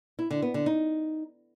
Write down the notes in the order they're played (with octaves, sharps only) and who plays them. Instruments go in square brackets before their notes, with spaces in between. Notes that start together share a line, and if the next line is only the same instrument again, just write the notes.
[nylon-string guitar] E4
D3
B3
D3
D#4